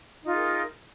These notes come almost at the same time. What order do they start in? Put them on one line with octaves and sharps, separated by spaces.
D#4 F4 G#4 A#4